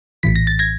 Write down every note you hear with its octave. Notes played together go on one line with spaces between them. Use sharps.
A#1 A2 E3 B6
A#6
A6
G#6 A#6